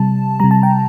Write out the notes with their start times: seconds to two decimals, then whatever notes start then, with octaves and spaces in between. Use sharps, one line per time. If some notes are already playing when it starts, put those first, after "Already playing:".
Already playing: C3 G3 A5
0.40 C3 G3 A#5
0.51 A5
0.63 G5